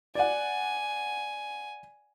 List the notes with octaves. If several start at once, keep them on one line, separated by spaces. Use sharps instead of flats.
D5 F#5 G#5